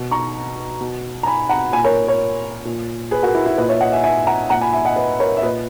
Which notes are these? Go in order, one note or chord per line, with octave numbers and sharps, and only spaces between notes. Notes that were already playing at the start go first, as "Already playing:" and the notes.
Already playing: B2
A#5 C#6
B2
A#5
G#5 B5
F#5 A#5
A#2 G#5 B5
A#4 C#5
A#4 C#5
A#2
G#4 B4
F#4 A#4
E4
E4
A#2 B4 D#5
C#5 E5
D#5 F#5
E5 G#5
E5 G#5
F#5 A#5
A#2 F#5 A#5
G#5 B5
E5 G#5
D#5 F#5
B4 D#5
A#4 C#5
E5
A#2 B4 D#5